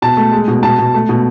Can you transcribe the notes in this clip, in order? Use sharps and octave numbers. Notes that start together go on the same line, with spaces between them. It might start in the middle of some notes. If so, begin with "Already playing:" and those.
B2 A5
A3
G#3
B2
B2 A5
B2
A3
B2